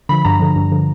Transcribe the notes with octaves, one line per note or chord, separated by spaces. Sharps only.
D3 F3 B5
G2 A#5
D3 F3
G2
D3 F3